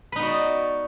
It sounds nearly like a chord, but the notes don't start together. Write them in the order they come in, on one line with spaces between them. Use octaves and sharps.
B4 D#4 B3 F#4 D5